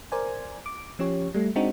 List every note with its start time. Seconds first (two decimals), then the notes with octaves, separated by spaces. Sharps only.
0.12 A#4 C5 D5 G#5
0.66 D6
0.99 F3 C#4 G4 C#5
1.34 G3 A3
1.55 G#3 C4 D4 D#4 F#4